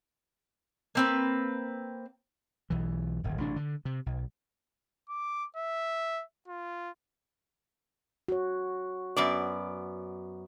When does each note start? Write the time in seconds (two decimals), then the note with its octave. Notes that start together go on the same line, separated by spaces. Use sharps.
0.95 A#3 C4 B4
2.70 B1 E3
3.24 D1 G#1
3.38 A1 C3 D4
3.56 D3
3.85 C3
4.06 B1
5.09 D6
5.57 E5
6.48 F4
8.28 F#4 C#5
9.16 F#2 B3 D5